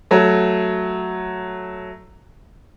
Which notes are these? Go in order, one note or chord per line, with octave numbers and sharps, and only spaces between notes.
F#3 A3